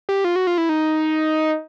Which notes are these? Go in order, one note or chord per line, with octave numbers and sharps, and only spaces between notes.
G4
F4
F#4
F4
E4
D#4